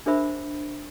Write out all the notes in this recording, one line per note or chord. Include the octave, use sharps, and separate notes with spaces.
D4 G#4 A#4 C5 E5 B5